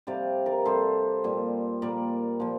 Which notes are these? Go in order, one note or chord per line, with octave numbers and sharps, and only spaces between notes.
C3 G3 D5 F5
A#4 D5
C3 G3 A4 C5
A#2 G3
A#2 G3 A#4 D5
A#2 F3